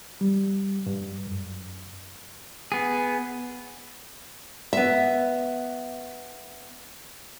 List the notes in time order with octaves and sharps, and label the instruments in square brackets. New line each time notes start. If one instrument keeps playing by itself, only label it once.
[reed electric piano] G3
G2
F#2
[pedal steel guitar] B3 G#4
[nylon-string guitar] B3 E5